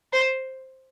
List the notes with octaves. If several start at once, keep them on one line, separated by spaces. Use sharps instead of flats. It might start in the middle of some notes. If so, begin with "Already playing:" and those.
C5